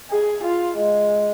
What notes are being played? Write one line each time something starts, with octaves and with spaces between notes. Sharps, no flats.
G#4
F4
G#3